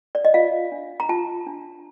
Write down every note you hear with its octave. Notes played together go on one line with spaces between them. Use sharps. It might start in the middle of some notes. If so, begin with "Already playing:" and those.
D5
D#5
F4 F5
D4
A#5
F4 A5
D4